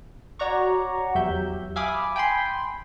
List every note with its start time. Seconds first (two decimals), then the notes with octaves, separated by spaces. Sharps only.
0.39 F#4 C#5 D5 F#5 A#5 C#6
1.15 E2 F#3 G4 E5 G6
1.76 E5 F5 G#5 B5 D6 D#6
2.16 G5 G#5 B5 C6